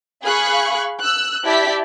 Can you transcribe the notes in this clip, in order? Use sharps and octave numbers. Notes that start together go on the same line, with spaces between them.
G#4 F5 B5 C#6 F#6
E6 F#6
E4 G4 D5 E5 A5 B6